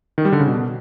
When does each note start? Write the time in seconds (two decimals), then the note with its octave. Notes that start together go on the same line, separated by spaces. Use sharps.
0.18 D#3
0.25 G3
0.32 D3
0.40 C#3
0.47 B2